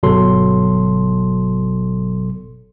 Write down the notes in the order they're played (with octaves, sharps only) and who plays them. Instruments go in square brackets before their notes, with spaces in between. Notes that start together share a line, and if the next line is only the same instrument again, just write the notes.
[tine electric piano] G1 B2 F#3 A4 C6